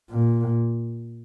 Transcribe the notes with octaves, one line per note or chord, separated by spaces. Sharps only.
A#2